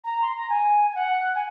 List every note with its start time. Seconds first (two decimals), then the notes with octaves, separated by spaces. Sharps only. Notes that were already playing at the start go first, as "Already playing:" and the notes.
0.04 A#5
0.22 C6
0.35 A#5
0.49 G#5
0.90 G#5
0.95 F#5
1.35 G#5